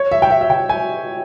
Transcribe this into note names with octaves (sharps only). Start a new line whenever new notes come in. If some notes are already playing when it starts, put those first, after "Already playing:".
Already playing: C#5
E5
G5
E5
E5
G5
G#5